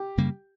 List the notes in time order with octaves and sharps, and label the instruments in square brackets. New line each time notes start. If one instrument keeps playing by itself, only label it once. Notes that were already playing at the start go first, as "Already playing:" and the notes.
Already playing: [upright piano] G4
[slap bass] F#2 C#3 G3 A#3